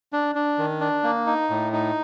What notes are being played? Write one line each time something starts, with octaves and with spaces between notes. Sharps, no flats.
D4
D4
D#3
D4
A#3
D#4
A2
D#4